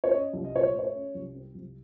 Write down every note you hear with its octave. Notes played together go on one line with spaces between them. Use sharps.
C#5
C#4 D#5
C2
D#5
A#2 C#5
C5
A3
C#5
C#4
C2
C4
C2